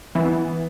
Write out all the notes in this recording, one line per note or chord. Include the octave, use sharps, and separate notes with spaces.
E3 B3